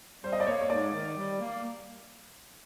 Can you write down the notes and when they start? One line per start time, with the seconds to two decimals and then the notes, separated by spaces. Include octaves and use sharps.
0.24 G3 C5
0.33 D#5
0.40 D5
0.47 A#3 C#5
0.61 C#5
0.70 G#2 D5
0.94 D#3
1.17 G3
1.40 A#3